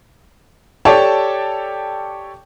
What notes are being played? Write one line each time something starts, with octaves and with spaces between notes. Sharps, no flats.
G4 A4 C#5 D5 G5 A5